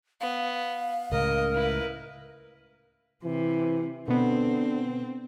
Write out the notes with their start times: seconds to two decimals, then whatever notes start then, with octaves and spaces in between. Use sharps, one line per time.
0.21 B3 F5
1.12 C#2 A2 C#3 A#4 D#5
1.54 E4 B4
3.24 C3 E3
4.08 B2 D3 B3 C4